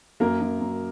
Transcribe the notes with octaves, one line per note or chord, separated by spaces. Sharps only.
F#2 A#3 A#4
F#2
F#2